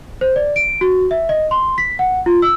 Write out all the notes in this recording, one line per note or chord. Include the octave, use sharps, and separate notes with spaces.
C5
D5
D7
F#4
E5
D#5
C6
B6
F#5
F4
E6